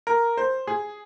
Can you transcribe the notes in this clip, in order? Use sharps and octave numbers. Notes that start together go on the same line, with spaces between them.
A#4
C5
G#4